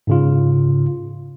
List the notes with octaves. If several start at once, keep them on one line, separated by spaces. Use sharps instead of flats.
G#2 C#3 F4